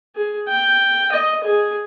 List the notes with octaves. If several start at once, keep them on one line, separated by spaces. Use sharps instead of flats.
G#4
G5
D#5
G#4